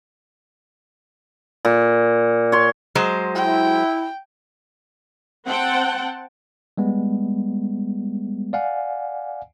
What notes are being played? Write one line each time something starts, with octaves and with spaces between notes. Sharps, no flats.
A#2
C#5 C6
F#3 G#3 C5
E4 G5
C4 F#5 G5 A5
G3 G#3 B3
D5 F5 F#5 G#5